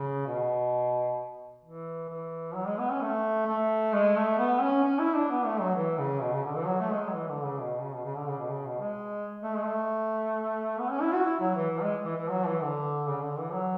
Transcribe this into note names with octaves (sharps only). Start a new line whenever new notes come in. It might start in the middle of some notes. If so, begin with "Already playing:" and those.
Already playing: C#3
B2
E3
E3
F#3
G#3
B3
C#4
A3
A3
G#3
A3
B3
C#4
C#4
E4
D4
B3
A3
F#3
E3
C#3
B2
C#3
D3
E3
F#3
A3
G#3
F#3
E3
D3
C#3
B2
C#3
B2
C#3
D3
C#3
B2
C#3
B2
G#3
A3
G#3
A3
B3
C#4
E4
F#4
E4
F#3
E3
E3
G#3
E3
E3
F#3
E3
D3
C#3
D3
E3
F#3